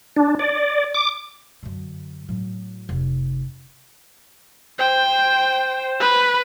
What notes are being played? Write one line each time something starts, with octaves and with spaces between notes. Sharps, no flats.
D4
D5
D6
F#2 D3
A2 F#3
F1
C5 G5
B4